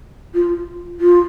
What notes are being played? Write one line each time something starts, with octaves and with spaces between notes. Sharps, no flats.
F4
F4